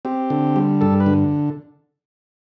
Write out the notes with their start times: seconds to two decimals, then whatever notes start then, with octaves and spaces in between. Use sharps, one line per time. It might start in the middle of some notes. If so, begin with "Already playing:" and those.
0.05 C4 G4
0.30 D3
0.56 G3
0.81 G2 A4
1.00 B4
1.06 D3